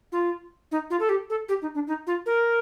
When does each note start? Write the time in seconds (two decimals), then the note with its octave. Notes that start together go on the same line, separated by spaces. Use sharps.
0.12 F4
0.71 D#4
0.90 F4
1.00 A4
1.09 G4
1.30 A4
1.49 G4
1.62 D#4
1.74 D4
1.87 D#4
2.07 F4
2.26 A#4